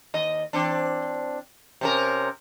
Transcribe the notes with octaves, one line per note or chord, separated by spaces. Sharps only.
D#2 D#5
E3 C4 D4
C3 C#4 A#4